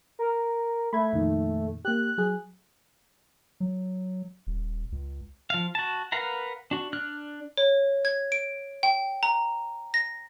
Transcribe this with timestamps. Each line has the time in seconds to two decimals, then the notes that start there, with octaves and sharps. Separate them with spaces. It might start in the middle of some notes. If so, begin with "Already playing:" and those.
0.19 A#4
0.93 A3 B5 G#6
1.13 F2 A#2 D#3
1.85 A#3 G4 F#6
2.18 F#3 G#4
3.60 F#3
4.47 D#1
4.92 C#2
5.50 F3 F5
5.75 F#4 A5
6.12 A#4 B4 F5 F#5 A#5
6.71 D4 F#4
6.93 D4 F6 F#6
7.57 C#5
8.05 G#6
8.32 D7
8.83 G5
9.23 A#5
9.94 A#6